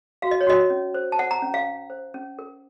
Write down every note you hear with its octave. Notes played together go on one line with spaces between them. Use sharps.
F#4 F5
D#5
C#5
F#4 D#5
C#4
C5
A5
C5 F#5
A#5
C#4
F5
C#4
C5
C#4
A#4